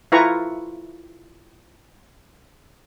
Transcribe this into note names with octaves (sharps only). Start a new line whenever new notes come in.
E4 F4 A4 B4 A#5 C#6